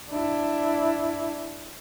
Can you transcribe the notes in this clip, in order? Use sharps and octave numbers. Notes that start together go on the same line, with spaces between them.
D4 E4